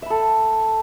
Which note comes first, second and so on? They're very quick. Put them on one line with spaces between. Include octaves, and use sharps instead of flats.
E5 B5 A4